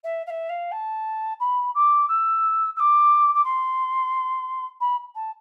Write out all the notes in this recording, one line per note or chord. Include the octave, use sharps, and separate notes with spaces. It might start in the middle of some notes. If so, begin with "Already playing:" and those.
E5
F5
E5
F5
A5
B5
D6
E6
E6
D6
D6
C6
B5
A5